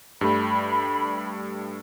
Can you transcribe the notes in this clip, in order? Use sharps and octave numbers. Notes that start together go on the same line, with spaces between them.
G2 G3 A3 B5